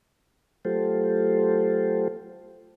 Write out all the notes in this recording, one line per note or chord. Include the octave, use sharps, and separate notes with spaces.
F#3 A3 F4 G4 A4 C5